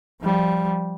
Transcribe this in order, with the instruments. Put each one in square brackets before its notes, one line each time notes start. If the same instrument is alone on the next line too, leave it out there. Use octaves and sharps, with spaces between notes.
[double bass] F3 G3